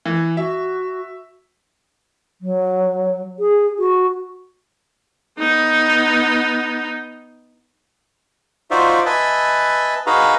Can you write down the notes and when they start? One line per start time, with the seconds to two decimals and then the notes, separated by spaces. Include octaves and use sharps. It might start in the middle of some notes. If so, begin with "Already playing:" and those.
0.05 E3
0.37 F#4 E5
2.41 F#3
3.39 G#4
3.79 F#4
5.39 B3 D#4
8.71 D#4 F4 F#4 C5 D5 E5
9.06 B4 D#5 E5 G#5 A5
10.07 D#4 F#4 G#4 B4 F5 A#5